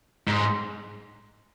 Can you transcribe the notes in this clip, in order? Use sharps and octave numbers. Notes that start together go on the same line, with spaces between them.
G#2